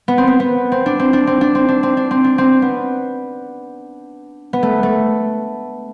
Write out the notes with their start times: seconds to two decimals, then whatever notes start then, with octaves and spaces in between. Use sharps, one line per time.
0.08 B3
0.18 C4
0.27 B3
0.40 B3
0.72 C4
0.86 D4
0.99 C4
1.13 D4
1.27 C4
1.41 D4
1.55 C4
1.68 D4
1.83 C4
1.97 D4
2.11 C4
2.24 D4
2.38 C4
2.62 B3
4.53 B3
4.63 A3
4.83 A3